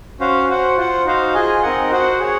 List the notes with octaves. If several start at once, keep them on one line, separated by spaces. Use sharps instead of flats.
C#4 F#4 C5 F5
F#4 C5 F#5
F4 C5 F#5
D#4 F#4 C5 F5
F4 G#4 D#5 G#5
C4 D#4 A#4 D#5 F#5
F#4 C5 F#5
G#4 C#5 F#5